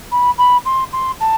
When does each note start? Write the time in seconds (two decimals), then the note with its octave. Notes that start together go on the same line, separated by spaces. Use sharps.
0.11 B5
0.38 B5
0.64 C6
0.92 C6
1.19 A5